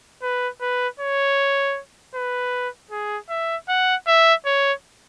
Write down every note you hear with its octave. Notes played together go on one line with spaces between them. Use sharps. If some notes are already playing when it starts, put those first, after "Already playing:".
B4
B4
C#5
B4
G#4
E5
F#5
E5
C#5